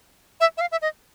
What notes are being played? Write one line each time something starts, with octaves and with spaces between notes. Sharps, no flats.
E5
E5
F5
E5
D#5